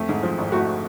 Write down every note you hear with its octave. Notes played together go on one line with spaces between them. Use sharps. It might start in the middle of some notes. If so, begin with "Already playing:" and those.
Already playing: F2 A3
G#2
F3
G#1
A3 F#4